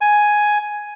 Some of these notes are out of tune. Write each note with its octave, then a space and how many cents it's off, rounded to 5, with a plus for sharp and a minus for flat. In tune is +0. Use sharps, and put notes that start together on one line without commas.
G#5 +5